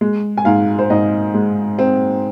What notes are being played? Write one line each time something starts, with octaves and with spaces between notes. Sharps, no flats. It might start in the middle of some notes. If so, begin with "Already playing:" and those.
G#3
G#5
G#2 F5
C5
G#2 D#5
G#3
C4